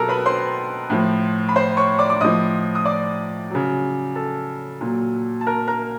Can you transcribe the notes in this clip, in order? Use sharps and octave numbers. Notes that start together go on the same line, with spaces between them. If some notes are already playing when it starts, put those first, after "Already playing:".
Already playing: B2 F#3 G4 A4 A#4 A5 A#5
B4 B5
C5 C6
A2 F3
B5
C5 C6
C#5 C#6
D5 D6
D6
A2 F3 D#5 D#6
D#6
D5 D6
C#3 F#3
A4 A5
A#2 F#3
A5
A#4 A#5
A#4 A#5